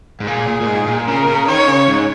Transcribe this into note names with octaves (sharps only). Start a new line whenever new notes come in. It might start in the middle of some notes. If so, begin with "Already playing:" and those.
G#2
A#2 G#4
A#2
A#2
G#2
A#2
C#3 A#4
C#3
D#3 C#5
C#3
G#2